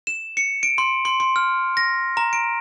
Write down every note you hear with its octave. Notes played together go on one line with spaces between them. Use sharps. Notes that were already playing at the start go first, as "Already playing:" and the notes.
E7
C#7
D7
C6
C6
C6
F6
A#6
A#5
D7